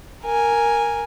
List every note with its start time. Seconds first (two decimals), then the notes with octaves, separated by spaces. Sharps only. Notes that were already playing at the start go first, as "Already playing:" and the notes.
0.24 A#4 G#5